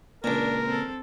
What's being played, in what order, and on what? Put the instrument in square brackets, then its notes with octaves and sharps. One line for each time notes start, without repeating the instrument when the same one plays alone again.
[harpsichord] C#2 A#2 [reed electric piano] C#3 A#3 [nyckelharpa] D4 [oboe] A#4
[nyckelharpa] C4 A4